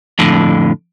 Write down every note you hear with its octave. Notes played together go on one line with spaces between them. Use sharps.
F2 A2 D3